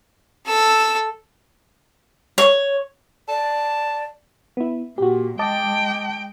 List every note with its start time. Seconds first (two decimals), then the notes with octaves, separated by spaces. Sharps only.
0.46 A4 E6
2.38 C#5
3.29 D5 A5
4.57 B3 E4
4.98 A#2 F#4 G4
5.39 G#3 D#5 G5 A5 D6